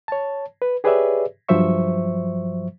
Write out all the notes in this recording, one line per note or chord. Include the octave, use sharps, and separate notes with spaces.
C#5 A5
B4
G4 G#4 B4 C#5 D5 E5
G2 F3 F#3 C5 E5 C#6